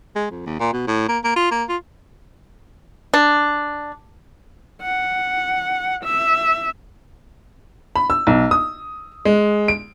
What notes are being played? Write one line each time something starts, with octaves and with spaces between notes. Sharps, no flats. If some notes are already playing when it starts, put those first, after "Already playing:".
G#3
F2
D#2
A#2
B2
A2
A#3
A#3
F4
A#3
F4
D4
F#5
E5
B5
E6
B1
D#6
G#3
D7